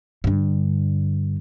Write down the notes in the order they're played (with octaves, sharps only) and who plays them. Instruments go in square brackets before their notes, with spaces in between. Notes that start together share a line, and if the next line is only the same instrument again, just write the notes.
[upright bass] G2 D3